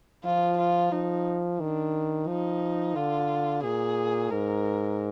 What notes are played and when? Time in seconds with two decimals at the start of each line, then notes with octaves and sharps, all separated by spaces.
0.24 F3 F4
0.58 F4
0.92 F3 D#4
1.60 D#3 D4
2.27 F3 D#4
2.95 D3 F4
3.64 A#2 G#4
4.31 G#2 A#4